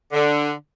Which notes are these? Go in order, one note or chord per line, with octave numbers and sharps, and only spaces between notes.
D3